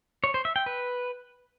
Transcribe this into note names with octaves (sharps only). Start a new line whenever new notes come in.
C#5
C5
E5
G5
B4